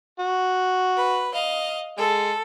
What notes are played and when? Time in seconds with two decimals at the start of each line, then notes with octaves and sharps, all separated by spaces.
0.19 F#4
0.97 B4
1.33 D#5 F5
1.98 G#3 A4